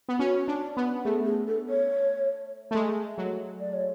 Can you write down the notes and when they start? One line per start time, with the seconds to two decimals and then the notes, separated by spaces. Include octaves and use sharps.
0.09 B3
0.19 C#4 F#4
0.48 D4
0.77 B3
1.05 A3 G#4
1.26 G#4
1.47 A4
1.69 C#5
2.71 A3
2.75 G#3
3.18 F#3
3.60 D5
3.74 C#5